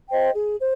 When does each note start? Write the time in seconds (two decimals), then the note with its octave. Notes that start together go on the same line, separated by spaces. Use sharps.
0.09 C5 D#5 G5
0.35 G#4
0.59 C5